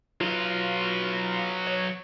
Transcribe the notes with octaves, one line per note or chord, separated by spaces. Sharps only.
F#3 F4 B4
C#5